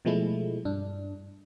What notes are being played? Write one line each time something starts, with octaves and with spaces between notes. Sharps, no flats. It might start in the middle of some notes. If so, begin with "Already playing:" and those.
B2 F3 G#3 A3 E4
G2 D4